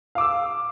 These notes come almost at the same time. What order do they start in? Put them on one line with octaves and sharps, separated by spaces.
F5 D6 E6